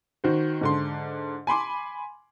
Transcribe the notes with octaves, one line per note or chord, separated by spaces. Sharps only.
D#3 F#4 C5
G#2 D3 C6
G#5 B5 C6 D6